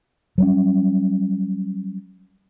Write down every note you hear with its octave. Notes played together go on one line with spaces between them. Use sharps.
F#3 G3 C#4